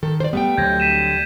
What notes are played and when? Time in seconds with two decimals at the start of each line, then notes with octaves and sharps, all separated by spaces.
0.03 D#3 A4
0.20 C5 D5
0.33 G3 A3 B3 G5
0.57 D2 D3 F#3 G6 G#6 A#6
0.80 B6 D#7 E7